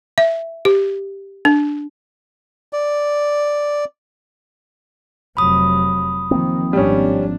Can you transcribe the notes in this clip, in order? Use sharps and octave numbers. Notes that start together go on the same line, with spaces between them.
E5
G4
D4
D5
F1 F#3 B5 D#6
D#3 F3 A#3 C4
G#1 G3 C#4 D4